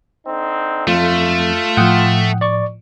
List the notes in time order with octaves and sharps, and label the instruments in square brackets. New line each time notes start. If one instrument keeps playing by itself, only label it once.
[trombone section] D3 C4 D#4
[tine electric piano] F2 [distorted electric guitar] A3 [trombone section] F4
[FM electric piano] A2 F3 [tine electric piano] F#5 G5 D#6
[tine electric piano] D5 C#6